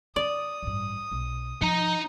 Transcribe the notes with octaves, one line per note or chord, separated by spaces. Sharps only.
D#3 D5 D#6
A1 G2
B1
F3 D#4 A#5